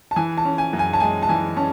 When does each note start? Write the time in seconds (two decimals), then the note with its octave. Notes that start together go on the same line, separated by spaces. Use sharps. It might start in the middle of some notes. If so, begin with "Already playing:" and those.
0.11 A5
0.16 E3 G#5
0.38 A5
0.45 C#4
0.58 G#5
0.73 F#2
0.79 G#5
0.93 A5
1.00 G#3 G#5
1.23 A5
1.29 E3 G#5
1.56 C#4 A5